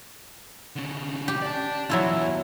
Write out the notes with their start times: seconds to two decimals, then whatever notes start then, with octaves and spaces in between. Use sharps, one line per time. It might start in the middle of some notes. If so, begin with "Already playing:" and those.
0.76 D3 C#4
1.28 G4
1.42 D5 A5
1.90 E2 F#3 E4 F4